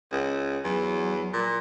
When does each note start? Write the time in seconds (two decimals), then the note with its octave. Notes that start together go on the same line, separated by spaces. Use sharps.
0.11 C#2
0.64 E2 F#3
1.33 A#2